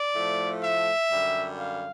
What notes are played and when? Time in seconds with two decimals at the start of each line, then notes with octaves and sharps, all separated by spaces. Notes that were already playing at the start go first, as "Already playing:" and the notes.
Already playing: D5
0.15 A2 F3 A3
0.63 E5
1.11 F#2 D3 G3
1.59 F5